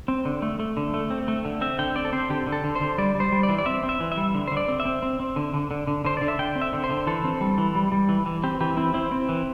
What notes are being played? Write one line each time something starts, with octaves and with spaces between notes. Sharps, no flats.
C4
D3
A3
A3
D3
A3
C4
A3
D3
C4 E5
D3 G5
C4 D5
A4
C4 C5
D3 G4
D3
A4
D3
C5
D3
G3 D5
G3
C5
G3
D5
E3
D5
C4 E5
C4
E5
E3
E5
G3
D3
C5
D3
D5
C4
E5
C4
C4
C4
D3
D3
D3
D3
D3 C5
D3 D5
E5
D3 G5
C4
E5
D3
C5
D3
E3 A4
C4
G3
E3
G3
G3
E3
E3
C4 G4
E3 G4
C4 E4
C4 E4
C4
E3